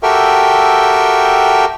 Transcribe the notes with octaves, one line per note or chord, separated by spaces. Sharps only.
F#4 G4 A4 A#4 E5 G5